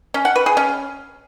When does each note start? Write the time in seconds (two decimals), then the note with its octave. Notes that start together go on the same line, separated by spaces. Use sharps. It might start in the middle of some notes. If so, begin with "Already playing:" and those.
0.14 C#4
0.25 F#5
0.36 B4
0.46 G#4
0.57 C#4